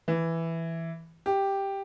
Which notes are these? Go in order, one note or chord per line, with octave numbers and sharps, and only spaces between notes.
E3
G4